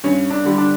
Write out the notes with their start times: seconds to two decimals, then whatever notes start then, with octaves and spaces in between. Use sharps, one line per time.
0.04 G2 C#4
0.30 D4
0.45 D3 G3
0.58 D4